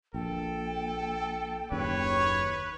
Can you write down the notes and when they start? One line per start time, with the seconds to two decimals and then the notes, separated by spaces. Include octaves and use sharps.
0.14 A#1 A4 G5
1.72 F#1 D#2 C#3 B4 C#5